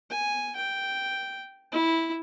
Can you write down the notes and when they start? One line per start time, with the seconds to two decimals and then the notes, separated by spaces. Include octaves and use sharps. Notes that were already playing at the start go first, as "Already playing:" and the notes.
0.10 G#5
0.56 G5
1.72 E4